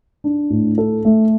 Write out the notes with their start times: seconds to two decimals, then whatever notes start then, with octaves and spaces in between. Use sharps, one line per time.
0.24 D4
0.50 A2
0.78 A4
1.05 A3